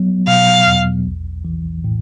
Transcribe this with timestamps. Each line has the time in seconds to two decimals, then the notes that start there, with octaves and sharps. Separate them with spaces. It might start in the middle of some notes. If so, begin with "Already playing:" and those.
Already playing: F#3 B3
0.27 B2 F5
0.67 E2
1.06 A#1
1.45 E3
1.84 A2